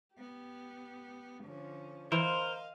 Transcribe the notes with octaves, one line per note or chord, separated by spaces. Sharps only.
B3 G4
D3 F3 C#4
E3 A#4 C5 D#5 F5